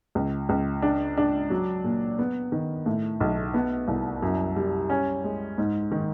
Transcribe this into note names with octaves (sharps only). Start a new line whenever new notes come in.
C#2
C#2
D4
D4
F#3
A#2
B3
D#3
A2
B1
B3
C2
F#2
G3
C#4
G#3
G#2
D#3